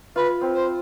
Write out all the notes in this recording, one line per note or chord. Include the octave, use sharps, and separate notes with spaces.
F4 B4
C4
C5